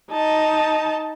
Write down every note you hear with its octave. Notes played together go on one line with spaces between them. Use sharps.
D#4 A5